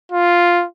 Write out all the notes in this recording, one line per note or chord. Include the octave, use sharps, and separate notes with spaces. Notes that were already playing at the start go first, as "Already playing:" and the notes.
F4